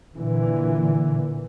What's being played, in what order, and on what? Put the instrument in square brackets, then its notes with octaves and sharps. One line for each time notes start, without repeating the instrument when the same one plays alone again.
[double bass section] A#2 D3 E3